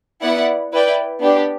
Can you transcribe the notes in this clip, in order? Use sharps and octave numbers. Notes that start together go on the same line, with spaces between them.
B3 E4 B4 D5 F#5
E4 B4 D5 G5
B3 D4 G4